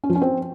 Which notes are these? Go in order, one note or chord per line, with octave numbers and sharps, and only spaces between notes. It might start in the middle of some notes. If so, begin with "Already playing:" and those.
C#4
F3
C#4
C4